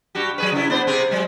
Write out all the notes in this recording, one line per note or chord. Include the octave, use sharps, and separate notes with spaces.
G2 F#4 G4
F#3 G#4 B4
C#3 E4
B3 D4 C5
C3 C4 G#4
F#3 G#3